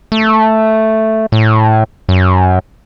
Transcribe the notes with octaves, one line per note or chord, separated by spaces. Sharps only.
A3
A2
F#2